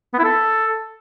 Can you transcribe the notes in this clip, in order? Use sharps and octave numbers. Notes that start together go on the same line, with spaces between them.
B3
E4
A4